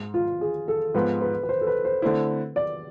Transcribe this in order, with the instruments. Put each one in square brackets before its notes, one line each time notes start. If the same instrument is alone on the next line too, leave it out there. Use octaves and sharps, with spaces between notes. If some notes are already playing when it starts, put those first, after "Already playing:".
Already playing: [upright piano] G#2
[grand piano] F4
G#4
A4
[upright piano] G#2 F3 G#3 B3 [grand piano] B4
[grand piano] B4
B4
C5
A4
B4
C5
[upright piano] D3 A3 C4 E4
[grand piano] D5